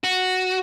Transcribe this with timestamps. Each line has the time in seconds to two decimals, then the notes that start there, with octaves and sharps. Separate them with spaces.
0.04 F#4